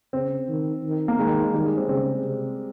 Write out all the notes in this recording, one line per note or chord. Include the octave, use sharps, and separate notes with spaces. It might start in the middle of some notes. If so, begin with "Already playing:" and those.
C#3 C4
D#3
D#3
A#3
D#3 G#3
D#3 G3
G#3
C4
C#3 C4
C3